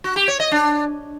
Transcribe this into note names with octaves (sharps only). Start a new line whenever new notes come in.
F#4
G4
C#5
D#5
D4